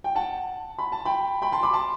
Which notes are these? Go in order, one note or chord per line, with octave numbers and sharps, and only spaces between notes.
G5
F#5 A5
B5
A5
G5 B5
G5 B5
A5 C6
B5 D6
A5 C6